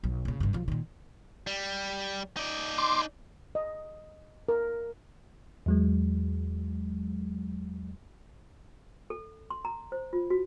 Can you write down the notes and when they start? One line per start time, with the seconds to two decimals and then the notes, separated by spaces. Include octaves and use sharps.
0.04 B1 F#3
0.25 A#2 C#3
0.40 G#1 G2
0.53 B1 F3
0.68 A#2 D#3
1.47 G3
2.37 D#4 D5
2.78 C6 D6
3.55 D#5
4.49 A#4
5.66 E2 F#3 G#3
9.10 A4
9.50 C6
9.65 A#5
9.92 C5
10.13 F4
10.30 F#4